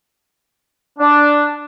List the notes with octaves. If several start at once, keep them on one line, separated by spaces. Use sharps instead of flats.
D4